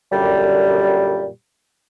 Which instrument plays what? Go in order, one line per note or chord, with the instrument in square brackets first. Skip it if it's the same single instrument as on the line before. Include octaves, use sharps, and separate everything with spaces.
[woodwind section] F#2 A#2 D3 G3